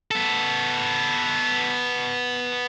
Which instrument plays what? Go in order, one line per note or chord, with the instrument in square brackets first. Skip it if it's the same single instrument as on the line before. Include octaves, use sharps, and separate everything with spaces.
[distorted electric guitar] B3 A4